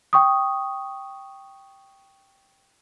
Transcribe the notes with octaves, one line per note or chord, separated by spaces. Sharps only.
G5 C#6 D#6